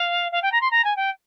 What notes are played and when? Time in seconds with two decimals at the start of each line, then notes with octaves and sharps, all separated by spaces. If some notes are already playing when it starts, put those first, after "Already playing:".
Already playing: F5
0.32 F5
0.42 G5
0.52 A#5
0.61 C6
0.71 A#5
0.84 G#5
0.96 G5